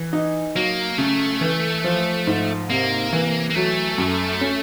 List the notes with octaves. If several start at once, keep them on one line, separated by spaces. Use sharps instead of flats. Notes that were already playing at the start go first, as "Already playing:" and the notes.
Already playing: E3
D#4
F#3 A#3
C#3 A3
E3
F3
G#2
C3 A#3
E3
A#3
F#3 A3
F#2
C#4